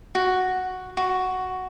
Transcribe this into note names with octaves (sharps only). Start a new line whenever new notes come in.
F#4
F#4